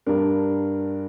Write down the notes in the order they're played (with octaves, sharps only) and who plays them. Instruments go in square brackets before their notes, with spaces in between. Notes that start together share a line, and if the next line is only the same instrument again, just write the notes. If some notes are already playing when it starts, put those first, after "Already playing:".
[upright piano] G2 G3 D4 A#4